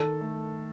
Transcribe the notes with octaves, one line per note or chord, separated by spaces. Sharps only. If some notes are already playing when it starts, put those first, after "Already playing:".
Already playing: D#3 A4
A3